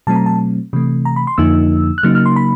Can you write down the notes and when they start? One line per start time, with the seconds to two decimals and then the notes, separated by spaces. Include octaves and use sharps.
0.07 B2 F#3 A3 C4 A5
0.16 A#5
0.26 A5
0.73 C3 E3 A3
1.05 A#5
1.16 B5
1.27 C6
1.38 F2 D3 F3 A#3 D#4 E6
1.98 F#6
2.03 C#3 F#3 A#3 D#4 F6
2.15 F6
2.26 C6
2.36 B5